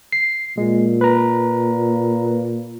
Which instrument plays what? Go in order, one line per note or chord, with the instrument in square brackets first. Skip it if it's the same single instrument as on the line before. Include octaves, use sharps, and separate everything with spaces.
[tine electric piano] C7
[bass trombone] A#2 [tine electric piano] G#3
[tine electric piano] B4 A#5